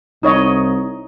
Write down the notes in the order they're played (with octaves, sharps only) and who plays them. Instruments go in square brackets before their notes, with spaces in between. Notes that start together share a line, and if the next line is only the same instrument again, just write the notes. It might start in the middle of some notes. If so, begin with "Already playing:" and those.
[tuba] C2 [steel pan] D#4 C#5 D#5